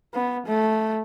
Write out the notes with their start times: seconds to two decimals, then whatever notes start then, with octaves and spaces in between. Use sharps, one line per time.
0.14 B3
0.47 A3